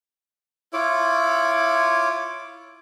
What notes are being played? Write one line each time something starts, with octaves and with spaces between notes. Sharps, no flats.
E4 F4 C#5 D6